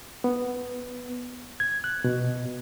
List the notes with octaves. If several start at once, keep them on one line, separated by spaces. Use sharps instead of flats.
B3
G#6
F#6
B2